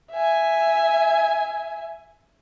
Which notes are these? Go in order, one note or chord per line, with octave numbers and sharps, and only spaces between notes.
E5 G#5